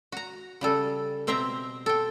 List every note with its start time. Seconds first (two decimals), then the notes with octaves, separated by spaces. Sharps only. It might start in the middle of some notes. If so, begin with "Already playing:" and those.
0.12 F#4 A#5
0.61 C#3 G3 A4
1.27 B2 C4 C5 E5 G5 A#5
1.86 A4 G5